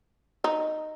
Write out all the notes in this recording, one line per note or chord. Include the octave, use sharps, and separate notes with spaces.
D#4